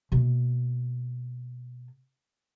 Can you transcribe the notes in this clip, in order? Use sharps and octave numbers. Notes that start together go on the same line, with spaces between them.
B2 A#3